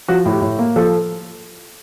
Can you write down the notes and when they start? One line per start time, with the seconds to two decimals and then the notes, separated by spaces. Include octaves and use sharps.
0.08 F3 F#4
0.25 A2
0.31 G4
0.42 A2
0.59 A#3
0.76 F3 A4